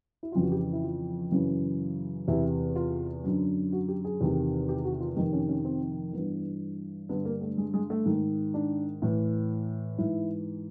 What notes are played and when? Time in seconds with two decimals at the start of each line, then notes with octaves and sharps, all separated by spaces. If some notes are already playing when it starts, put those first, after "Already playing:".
0.23 E4
0.32 F2 C#3 E3 F4
0.42 F#4
0.52 G4
0.73 E4
0.83 F4
1.32 F#2 C#3 E3
2.28 E2 C3 E3 E4
2.76 F4
3.24 F#2 D3
3.72 F#4
3.88 G4
4.04 G#4
4.21 E2 C3 D#3
4.69 G4
4.85 F#4
5.01 F4
5.17 F2 C3 D#3 D#4
5.33 C#4
5.49 C#4
5.65 C4
6.13 G2 E3 B3
7.09 G2 D3 B3
7.25 A#3
7.41 A3
7.57 G#3
7.74 G#3
7.90 A3
8.06 G#2 D#3
8.54 D4
9.02 A2 E3
9.98 G#2 E3 E4